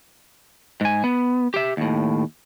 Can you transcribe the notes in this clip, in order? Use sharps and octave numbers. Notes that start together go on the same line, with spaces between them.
G#2 G#5
B3
G4 E5
D#2 A2